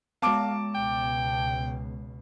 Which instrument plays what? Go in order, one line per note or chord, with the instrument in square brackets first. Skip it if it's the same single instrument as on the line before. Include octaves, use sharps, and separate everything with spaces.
[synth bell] G#3 B3 [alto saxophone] F5 [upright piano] A5 D6 D7
[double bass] C#2 B2 [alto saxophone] G5